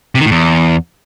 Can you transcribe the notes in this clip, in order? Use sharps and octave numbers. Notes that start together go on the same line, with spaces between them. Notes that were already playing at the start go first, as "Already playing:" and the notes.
C3
D#3
A2
E2